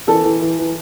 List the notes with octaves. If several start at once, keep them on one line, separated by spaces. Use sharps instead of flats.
E3 A4
E3
E3
E3